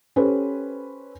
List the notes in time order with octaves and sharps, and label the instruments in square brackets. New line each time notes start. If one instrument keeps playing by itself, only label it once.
[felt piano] C#4 G4 A4 B4 C5